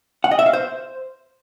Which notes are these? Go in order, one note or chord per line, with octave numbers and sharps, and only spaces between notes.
F#5
D#5
E5
F5
C5